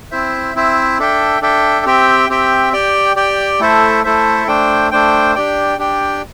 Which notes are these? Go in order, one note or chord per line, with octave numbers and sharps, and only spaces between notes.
C4 E4 C5 E5
C4 E4 C5 E5
D4 A4 E5 G5
D4 A4 E5 G5
C4 G4 E5 G5
C4 G4 E5 G5
G4 D5 G5
G4 D5 G5
A3 E4 A4 C5 E5
A3 E4 A4 C5 E5
A3 D4 C5 G5
A3 D4 C5 G5
D4 G4 D5 G5
D4 G4 D5 G5